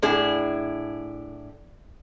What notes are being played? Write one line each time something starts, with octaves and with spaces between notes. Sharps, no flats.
A2 D4 E4 G#4